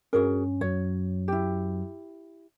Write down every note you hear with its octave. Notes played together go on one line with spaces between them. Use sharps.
G2 C#4 F#4 G#4 A#4
F#2 F#3 C#5
E4 G4